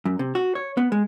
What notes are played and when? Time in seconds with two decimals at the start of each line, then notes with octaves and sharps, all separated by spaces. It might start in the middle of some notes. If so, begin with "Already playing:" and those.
0.05 F#2
0.19 C3
0.35 F#4
0.55 C#5
0.77 B3
0.92 G#3